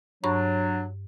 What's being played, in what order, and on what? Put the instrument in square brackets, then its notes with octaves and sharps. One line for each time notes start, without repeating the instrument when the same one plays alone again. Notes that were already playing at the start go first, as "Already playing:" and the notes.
[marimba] G2 A#5 C#6 [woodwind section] F#3 D4